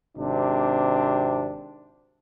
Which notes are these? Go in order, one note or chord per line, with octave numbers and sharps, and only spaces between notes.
G#1 C3 D4